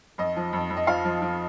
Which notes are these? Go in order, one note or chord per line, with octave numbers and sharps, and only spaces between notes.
F2 D#5
F3
F2
F2
D#5
F3 F5
F3
F3